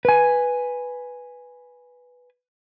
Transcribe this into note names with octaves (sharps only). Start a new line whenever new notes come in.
B4 G#5